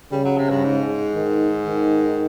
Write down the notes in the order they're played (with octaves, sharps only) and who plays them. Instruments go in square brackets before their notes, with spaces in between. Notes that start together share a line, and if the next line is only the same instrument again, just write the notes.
[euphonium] C#3 [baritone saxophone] G3
[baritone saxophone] F#3
C3
G2
G#2
[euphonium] D#3
D#3